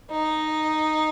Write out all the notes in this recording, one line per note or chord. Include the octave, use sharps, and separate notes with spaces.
D#4